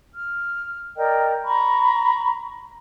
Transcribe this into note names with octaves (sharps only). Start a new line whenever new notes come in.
F6
A#4 D5 D#5 G5
A#5 B5 C#6